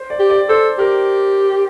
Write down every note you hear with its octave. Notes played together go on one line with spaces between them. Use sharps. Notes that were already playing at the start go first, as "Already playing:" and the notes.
Already playing: C5
D5
G4
D5
A4 C5
G4 A#4